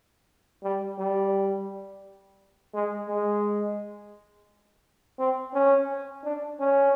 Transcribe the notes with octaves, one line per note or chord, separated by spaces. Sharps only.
G3
G3
G#3
G#3
C4
C#4
D4
C#4